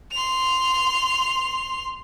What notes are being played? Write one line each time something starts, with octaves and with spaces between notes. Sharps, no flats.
C6 F7